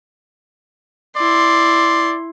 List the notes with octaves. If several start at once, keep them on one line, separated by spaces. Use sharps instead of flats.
E4 D5 C6